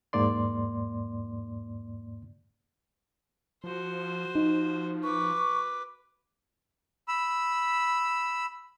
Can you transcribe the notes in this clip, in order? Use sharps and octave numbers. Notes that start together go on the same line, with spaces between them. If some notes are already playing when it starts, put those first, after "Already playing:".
E2 G#2 A#3 D5 C6
F3 F#4 C5
F3 D#4
B4 C#6 D6
B5 E6